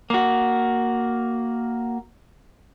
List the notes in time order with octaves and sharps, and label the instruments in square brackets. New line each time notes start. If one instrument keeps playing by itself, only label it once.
[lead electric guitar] A#3 F#4